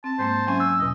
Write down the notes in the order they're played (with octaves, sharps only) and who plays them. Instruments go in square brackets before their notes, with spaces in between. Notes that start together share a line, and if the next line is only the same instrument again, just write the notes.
[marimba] C4 [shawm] A5
[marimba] G#2 G#3 A#3 [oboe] C5
[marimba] F#3 C#4 E5 [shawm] G#5
[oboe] E6 [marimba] F#6
[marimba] E2 B2 [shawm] D#5